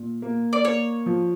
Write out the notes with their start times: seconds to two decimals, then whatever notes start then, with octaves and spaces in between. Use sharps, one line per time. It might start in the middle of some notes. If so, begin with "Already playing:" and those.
Already playing: A#2
0.22 A#3
0.53 D5
0.64 A#3 C#5
1.06 F3